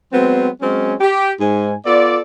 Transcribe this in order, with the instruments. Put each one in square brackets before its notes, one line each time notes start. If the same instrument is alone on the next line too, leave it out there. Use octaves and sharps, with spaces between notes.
[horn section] F#3 G#3 B3 C4
F#3 G#3 C4 C#4
G4
G#2 G#5
B3 F4 A4 D5